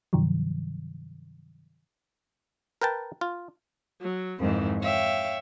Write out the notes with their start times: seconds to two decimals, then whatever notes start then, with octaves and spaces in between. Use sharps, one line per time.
0.13 G2 C3 D#3 F3 F#3
2.82 A#4 B4 G5 A5
3.21 F4
4.01 F#3
4.39 F2 G#2 D#3 E3
4.82 C#5 E5 F5 G5